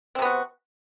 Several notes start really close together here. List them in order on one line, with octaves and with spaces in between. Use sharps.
C4 C3 B3 F#4